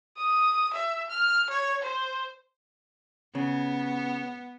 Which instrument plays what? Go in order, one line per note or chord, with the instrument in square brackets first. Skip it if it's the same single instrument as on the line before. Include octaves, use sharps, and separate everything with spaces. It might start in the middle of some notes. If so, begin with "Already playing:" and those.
[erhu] D#6
E5
F6
C#5
C5
[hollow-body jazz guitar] C#3 [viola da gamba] B3